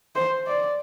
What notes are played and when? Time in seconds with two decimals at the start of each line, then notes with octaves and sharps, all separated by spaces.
0.15 C5
0.47 D5